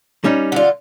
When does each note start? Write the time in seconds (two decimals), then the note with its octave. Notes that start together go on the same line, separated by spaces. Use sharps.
0.24 G3 C#4 D#4
0.52 D3 F4